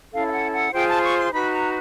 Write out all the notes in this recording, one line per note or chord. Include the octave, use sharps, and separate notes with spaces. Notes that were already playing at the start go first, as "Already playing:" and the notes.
C#4 E4 A4 F5
F5
F#5
F#5
F4 G#4 C5 G5
A5
C#6
C6
D#4 F#4 B4 B5
A#5